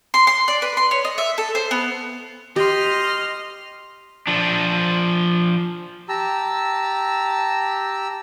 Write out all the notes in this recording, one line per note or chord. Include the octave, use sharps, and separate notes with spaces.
C6
C6
D5
B4
C6
C#5
D#5
E5
A4
C5
B3
G4 D#5 C6 F6
F3 D4
G4 A5 A#5 E6